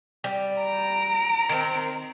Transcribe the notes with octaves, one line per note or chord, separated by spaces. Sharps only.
G3
A#5 D7
D#3 C4